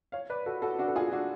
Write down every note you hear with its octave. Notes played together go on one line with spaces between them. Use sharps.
C#5 F5
B4 D5
F#4 A4
F#4 A4
D4 F#4
A4
F4 G#4
D4 F#4